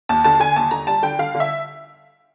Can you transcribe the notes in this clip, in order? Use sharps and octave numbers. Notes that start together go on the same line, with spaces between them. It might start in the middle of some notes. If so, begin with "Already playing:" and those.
D#2 A5
D3 A5
D3 G#5
D#2 A5
D3 A#5
G3 A5
D3 G5
D3 F5
D3
E5